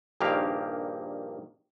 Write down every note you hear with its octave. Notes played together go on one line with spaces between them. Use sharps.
A#1 G2 D#3 A#3 G4 F5